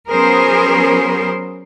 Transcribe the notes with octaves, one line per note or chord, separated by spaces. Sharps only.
F#3 B3 C#4 G#4 A#4 C5